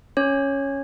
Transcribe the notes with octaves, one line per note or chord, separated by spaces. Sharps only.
C#4 C#5